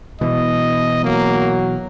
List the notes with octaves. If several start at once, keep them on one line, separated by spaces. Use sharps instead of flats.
B2 E3 D#5
F#3 A#3